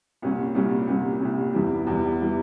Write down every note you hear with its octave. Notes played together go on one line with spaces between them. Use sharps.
C2 A#2 G3 C#4
C2 A#2 G3 C#4
C2 A#2 G3 C#4
C2 A#2 G3 C#4
E2 E3 G3
E2 E3 G3
E3 G3